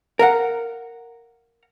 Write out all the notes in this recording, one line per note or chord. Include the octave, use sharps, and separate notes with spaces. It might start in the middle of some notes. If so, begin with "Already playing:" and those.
A#4 F5 F#5